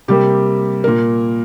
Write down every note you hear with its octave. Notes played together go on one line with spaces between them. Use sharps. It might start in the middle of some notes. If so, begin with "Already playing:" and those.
C3 G3 A#3 G4
A#2 A#3 A#4